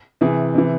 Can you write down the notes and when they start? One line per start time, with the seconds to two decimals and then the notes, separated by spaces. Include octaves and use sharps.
0.21 C3 E3 G#4
0.55 C3 E3